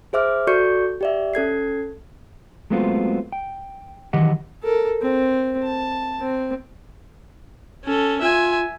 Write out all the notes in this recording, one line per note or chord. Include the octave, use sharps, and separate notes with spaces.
G#4 C5 E5 D6 F6
F#4 A4 D5 C#6 G6 C#7
G4 D5 E5
C#4 A4 G#6 C7
F#3 G#3 A3 B3 C4 F4
G5
D#3 E3 F#3 G4 D#5 F#5
A4 A#4
C4
A5
C4
C#4 A4
F4 E5 G#5